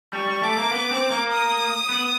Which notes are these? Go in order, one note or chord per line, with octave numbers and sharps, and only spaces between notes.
G3 C#6
G3
A3 D6
A#3
B3
C4
A#3
D#6
B3